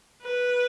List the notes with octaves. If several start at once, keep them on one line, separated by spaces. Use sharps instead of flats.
B4